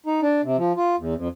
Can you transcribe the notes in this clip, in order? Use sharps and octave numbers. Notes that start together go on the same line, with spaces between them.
D#4
D4
C3
F3
F4
E2
F2